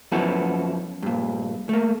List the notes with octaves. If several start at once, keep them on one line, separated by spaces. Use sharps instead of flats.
F#2 F3 B3 E4 F#4 A4
G2 A#2
A3 A#3